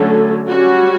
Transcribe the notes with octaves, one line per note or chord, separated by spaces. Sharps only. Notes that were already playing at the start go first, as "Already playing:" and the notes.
Already playing: D3 F#3 A3 C#4 A4
G3 C#4 F#4